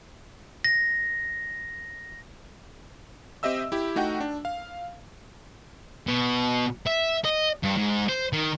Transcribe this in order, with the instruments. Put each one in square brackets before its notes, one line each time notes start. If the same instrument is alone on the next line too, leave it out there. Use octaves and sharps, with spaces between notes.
[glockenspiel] A#6
[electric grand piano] C4 G4 D#5 E5 E6
E4 G4
A3 D#4 F#4 F#5 G5
D4
F5
[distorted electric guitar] B2
E5
D#5
G2
G#2
C5
D#3